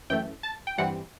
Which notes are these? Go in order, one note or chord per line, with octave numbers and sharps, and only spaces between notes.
F#2 E3 A3 G5
A5
G5
G2 E3 G3 C4 F#5